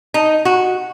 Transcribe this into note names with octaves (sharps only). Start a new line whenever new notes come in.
D#4
F#4